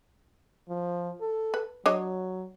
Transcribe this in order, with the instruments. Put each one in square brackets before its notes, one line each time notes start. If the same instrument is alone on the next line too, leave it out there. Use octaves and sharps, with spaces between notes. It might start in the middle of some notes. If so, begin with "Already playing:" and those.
[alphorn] F3
A4
[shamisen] B4
[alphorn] F#3 [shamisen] D4 C#5 D#5